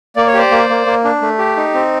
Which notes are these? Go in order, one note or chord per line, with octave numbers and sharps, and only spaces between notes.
A#3 D5
C#5
G4 C5 D5
A#3
A#3
A#3
D4
A3
G4
D#4
C4